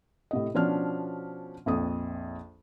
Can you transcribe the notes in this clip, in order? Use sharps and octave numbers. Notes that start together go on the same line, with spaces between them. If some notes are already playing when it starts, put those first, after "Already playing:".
A2 C3 D#5
B2 F3 C#4 D4 F6
A#1 F2 D#6